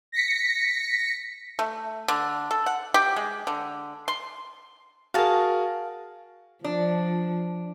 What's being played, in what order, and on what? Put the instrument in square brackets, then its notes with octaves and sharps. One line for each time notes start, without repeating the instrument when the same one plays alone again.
[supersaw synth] A#6 B6 C#7
[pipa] A3
D3
A4
F#5
G4
G#3
D3
C6
[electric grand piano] F#4 G#4 A#4 [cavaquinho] F5 A5
[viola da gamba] F3 [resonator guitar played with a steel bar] D4